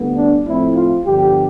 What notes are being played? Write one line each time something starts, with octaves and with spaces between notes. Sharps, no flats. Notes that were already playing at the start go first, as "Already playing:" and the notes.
Already playing: D2 D3 G3 B3
D4
A2 F3 A3 C4 E4
F4
G2 D3 F3 B3 G4